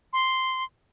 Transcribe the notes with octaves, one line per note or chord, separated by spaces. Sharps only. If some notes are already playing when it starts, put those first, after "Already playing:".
C6